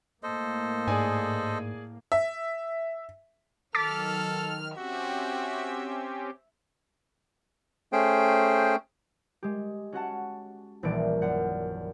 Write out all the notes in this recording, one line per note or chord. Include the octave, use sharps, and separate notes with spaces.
A2 A#3 A4 C5 D#5
G#2 G#4 D5 G#5
E5
D#3 F#3 A4 D6 F6 A6 B6
C4 C#4 F#4 G4 E5
A3 C#4 G#4 C5 G5
G#3 G4
C#4 F#4 F#5 A5
D#1 A#1 E3 D5 D7
F#2 F#5